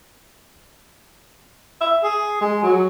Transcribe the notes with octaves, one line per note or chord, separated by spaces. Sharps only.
E5
G#4
G#3
F#3